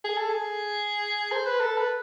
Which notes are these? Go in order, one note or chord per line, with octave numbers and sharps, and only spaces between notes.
G#4
A4
G#4
C5
B4
A4
B4